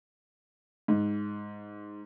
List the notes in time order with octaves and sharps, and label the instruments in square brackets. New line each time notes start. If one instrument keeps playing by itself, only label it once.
[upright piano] G#2